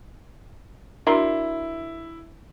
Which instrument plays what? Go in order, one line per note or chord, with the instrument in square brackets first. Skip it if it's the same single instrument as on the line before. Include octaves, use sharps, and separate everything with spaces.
[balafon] D4 F#4 [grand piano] E4 [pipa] A#4 D5 C6